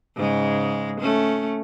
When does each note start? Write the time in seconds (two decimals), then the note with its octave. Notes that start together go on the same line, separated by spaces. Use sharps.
0.16 G#2 C#3 G#3
1.00 A3 C#4